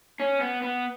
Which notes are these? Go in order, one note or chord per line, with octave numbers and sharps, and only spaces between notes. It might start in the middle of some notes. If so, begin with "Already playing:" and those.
C#4
B3
B3